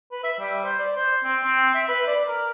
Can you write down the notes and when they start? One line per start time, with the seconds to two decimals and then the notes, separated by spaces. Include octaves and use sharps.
0.11 B4
0.24 E5
0.39 G3
0.64 C5
0.79 D5
0.96 C5
1.24 C4
1.44 C4
1.74 E5
1.88 B4
2.07 D5
2.28 A#4